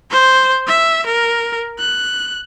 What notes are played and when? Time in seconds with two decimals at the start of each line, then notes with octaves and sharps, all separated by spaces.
0.11 C5
0.67 E5
1.07 A#4
1.79 F#6